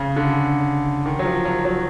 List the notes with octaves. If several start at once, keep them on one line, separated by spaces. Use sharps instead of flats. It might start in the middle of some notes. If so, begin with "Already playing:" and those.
Already playing: C#3
D3
D#3
F#3
F3
F#3
F#3